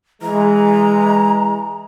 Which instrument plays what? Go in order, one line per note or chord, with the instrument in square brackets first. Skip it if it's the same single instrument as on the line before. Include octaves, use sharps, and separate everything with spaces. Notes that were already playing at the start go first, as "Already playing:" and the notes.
[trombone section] E3 G#3 [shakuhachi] A#5